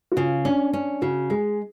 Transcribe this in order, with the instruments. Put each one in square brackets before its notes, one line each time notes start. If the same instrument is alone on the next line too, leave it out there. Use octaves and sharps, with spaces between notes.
[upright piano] F#4
[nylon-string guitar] C#3 [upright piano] F4
[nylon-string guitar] C#4 [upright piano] D4
[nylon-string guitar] C#4 [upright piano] D4
[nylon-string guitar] C#3 [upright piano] F#4
[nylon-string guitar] G#3 [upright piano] G#4